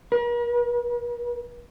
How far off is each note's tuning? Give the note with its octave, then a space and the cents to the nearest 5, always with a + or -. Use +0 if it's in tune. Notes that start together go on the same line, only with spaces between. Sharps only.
A#4 +45